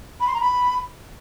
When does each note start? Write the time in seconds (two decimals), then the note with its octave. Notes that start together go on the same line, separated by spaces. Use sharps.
0.20 B5
0.27 C6
0.34 A#5
0.41 B5